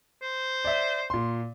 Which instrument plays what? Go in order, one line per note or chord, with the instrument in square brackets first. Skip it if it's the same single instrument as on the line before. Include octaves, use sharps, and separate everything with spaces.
[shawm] C5
[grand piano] D5 E5
A#2 C6